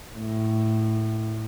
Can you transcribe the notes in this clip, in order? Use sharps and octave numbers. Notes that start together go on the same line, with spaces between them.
A2